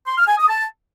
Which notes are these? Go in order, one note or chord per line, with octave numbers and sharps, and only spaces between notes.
C6
F6
G#5
D#6
A5